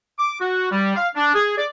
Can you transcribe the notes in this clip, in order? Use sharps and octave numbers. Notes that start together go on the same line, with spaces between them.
D6
F#4
G3
F5
D4
G#4
D5